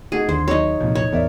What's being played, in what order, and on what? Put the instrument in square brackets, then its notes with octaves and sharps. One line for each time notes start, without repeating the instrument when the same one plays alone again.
[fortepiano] A3 D#4 F#4 [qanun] G#4
[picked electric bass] D#2 [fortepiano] D3 [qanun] C5
[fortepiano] F#3 [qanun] D#4 C#5
[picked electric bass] C2 A#2 [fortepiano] F2 F3
[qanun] C#5
[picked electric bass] A1 E2 B3 [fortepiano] A#4 D5 E5